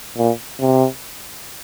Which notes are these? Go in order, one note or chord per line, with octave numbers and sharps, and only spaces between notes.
A#2
C3